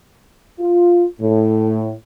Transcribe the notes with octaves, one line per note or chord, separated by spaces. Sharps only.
F4
A2